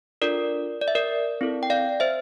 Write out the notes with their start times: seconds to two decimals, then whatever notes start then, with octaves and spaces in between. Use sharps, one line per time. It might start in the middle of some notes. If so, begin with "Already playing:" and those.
0.22 D4 F4 A4 A#4 D5
0.81 D5
0.88 E5
0.95 A#4 D5
1.41 C4 E4 A4
1.63 G5
1.70 D5 F5
2.00 C5 E5